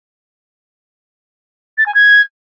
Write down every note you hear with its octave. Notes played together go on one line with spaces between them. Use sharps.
A6
G#5
G#6